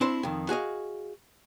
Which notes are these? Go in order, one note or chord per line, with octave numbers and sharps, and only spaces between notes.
C4 D4 E4 C5
F2 D#3
F#4 G#4 D#5 F5